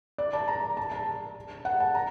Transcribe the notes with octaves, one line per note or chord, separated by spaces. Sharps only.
D5
A5
A#5
A5
A5
F#5
A5
A#5